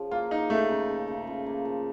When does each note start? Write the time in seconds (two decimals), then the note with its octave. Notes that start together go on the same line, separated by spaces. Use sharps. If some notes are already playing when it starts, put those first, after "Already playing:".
Already playing: C#3 F3
0.11 A#3 F4
0.31 A#3 D#4
0.50 C#3 A3
0.69 C#3
0.89 C#3
1.07 C#3
1.27 F4
1.46 A#3
1.65 F3